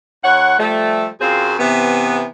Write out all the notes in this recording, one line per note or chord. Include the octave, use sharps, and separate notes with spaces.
D#2 C#5 F#5
F3 G3 A3
F#2 C4 F4 G#4 C5
C3 E3 B3